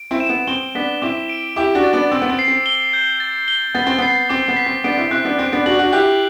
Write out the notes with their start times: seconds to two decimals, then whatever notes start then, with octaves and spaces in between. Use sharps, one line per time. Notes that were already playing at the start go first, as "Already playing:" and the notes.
Already playing: D7
0.11 C4 E4
0.20 E7
0.29 B3
0.47 C4 G7
0.75 B3 D4 B6
1.02 C4 E4 D6
1.29 D7
1.56 E4 G4 D6
1.75 D4 F#4
1.84 A6
1.93 B3 D4
2.12 C4 E6
2.22 B3
2.30 C4
2.39 C7
2.48 C4
2.66 G7
2.93 G6
3.20 A6
3.48 G7
3.75 B3 A6
3.87 C4
3.98 B3 C7
4.29 C4 D6
4.48 B3
4.57 B6
4.66 C4
4.84 B3 D4 D7
4.97 C4 E4
5.11 C4 E4 F#6
5.25 B3 D4
5.38 C4 F#6
5.53 B3 D4
5.66 D4 F#4 F#7
5.79 D4 F#4
5.93 E4 G4 F#6